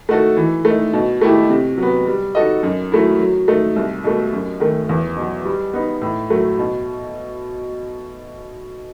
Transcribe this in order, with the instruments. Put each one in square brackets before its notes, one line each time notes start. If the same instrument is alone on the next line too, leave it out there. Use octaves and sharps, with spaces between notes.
[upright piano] A3 D#4 F#4 A4
E3
A3
D#4
B2
A3 E4 G4
C3
F#3 B3
G3
D#4 F#4 A4 D#5
F#2
F#3 A3 E4
F#3
A3 D#4
C2
B2 A3
F#2
D#3 A3
E2
B2 F#3
G3
B3 D#4
A2
F#3 A3
B2